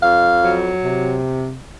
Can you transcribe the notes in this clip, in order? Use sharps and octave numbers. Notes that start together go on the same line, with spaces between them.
F2 F5
F#3
C3